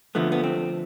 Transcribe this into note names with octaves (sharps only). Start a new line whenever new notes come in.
D3 F3 A3 B3
B3
C4